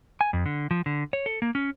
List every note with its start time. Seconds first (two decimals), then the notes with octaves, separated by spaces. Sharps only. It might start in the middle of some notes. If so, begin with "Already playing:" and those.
0.21 G#5
0.33 F2
0.46 D3
0.71 F3
0.86 D3
1.13 C#5
1.26 A4
1.42 A#3
1.55 C#4